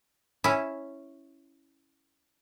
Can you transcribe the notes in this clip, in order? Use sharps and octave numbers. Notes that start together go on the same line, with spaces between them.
C#4 E4